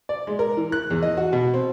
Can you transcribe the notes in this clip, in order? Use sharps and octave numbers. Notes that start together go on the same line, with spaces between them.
D5
G#3
A#4
E3
F#6
E2
D#5
F#4
B2
C4